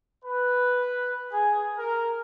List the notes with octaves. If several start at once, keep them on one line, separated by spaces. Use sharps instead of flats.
B4
G#4
A#4